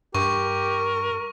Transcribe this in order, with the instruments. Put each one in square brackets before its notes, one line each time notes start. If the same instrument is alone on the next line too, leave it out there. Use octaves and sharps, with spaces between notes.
[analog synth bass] G2 [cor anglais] G4 [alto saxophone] A#4 [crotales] C#6